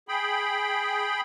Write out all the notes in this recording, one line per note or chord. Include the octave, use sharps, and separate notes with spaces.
G#4 G5 B5